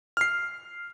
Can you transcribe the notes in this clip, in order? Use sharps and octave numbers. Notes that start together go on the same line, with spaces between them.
F6 C7